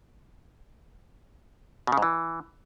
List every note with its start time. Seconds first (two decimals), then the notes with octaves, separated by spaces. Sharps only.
1.87 B2
1.92 C#3
1.97 G#2
2.02 E3